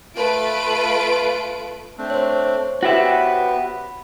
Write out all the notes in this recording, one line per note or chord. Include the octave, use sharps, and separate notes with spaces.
A3 F4 B4 D7
A3 C4 D4
C5 C#5
B3 F#4 G4 B4 E5
B5